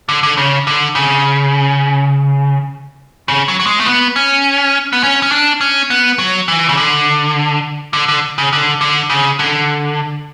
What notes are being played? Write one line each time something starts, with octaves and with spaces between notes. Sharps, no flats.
D3
D3
C#3
D3
C#3
C#3
F#3
F#3
G#3
A3
B3
C#4
B3
C#4
C#4
D4
C#4
B3
F#3
E3
C#3
D3
D3
D3
C#3
D3
D3
C#3
D3